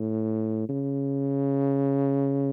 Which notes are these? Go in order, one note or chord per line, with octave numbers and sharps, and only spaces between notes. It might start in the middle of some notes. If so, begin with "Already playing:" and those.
Already playing: A2
C#3